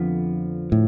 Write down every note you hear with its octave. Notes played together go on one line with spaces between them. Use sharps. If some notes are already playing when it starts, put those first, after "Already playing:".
Already playing: F2 D3 F3 B3
A2